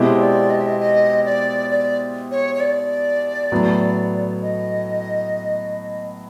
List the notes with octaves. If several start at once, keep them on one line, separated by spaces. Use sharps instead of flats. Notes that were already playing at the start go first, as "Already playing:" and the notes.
Already playing: B2 G#3 C4 E4 G4
C#5
D5
D#5
E5
D#5
D#5
D5
D5
C#5
C#5
D5
A2 F#3 B3
D#5